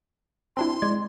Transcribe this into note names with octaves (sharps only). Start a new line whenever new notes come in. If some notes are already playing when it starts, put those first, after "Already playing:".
C4 D4 E4 C6
G#3 D5 G#6